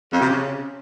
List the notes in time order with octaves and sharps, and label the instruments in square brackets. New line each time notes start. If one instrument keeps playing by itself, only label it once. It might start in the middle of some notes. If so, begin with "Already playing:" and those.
[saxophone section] F2
C3
C#3